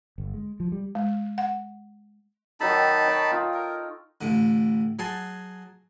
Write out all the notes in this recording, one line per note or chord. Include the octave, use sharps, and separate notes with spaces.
G1
G#3
F3
G3
G#3
F#5
D#3 F#3 D#4 A4 A5 B5
C#5 G5
D#4 F4
A#4
A1 A2 D3
F#3 G#4 G#5 A5 C6